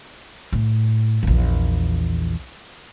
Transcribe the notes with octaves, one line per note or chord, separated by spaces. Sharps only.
A2
A#1 E2